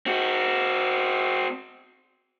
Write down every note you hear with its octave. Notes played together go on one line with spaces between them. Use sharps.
C4 F#4